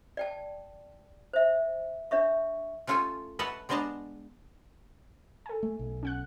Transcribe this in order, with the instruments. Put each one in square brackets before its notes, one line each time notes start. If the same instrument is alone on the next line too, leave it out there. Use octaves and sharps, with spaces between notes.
[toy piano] D5 G5 A5
C5 E5
D4 C#5 E5 C#6
[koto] A3 C#4 F4 A4 G#5
B4 C#5 D#5 E5 F#5 A5
G#3 B3 D4 D#5 A5 A#5
[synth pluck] A4 G#5
[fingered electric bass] A3
B1
[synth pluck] C#4 F#5 F#6